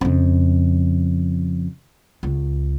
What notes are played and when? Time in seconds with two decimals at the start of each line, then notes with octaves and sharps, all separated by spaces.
0.01 F2 C#3
2.23 C#2